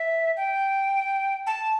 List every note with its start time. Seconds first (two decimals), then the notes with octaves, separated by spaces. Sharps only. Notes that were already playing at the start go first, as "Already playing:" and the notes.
Already playing: E5
0.37 G5
1.47 A5